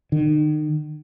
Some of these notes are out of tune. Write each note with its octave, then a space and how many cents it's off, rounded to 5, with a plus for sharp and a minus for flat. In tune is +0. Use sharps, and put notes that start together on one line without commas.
D#3 -35